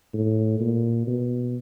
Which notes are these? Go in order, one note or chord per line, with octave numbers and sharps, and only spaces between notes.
A2
A#2
B2